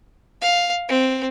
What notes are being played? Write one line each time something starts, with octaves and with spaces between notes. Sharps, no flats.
F5
C4